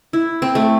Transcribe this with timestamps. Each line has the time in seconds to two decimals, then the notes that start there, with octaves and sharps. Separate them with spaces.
0.13 E4
0.42 C4
0.55 A3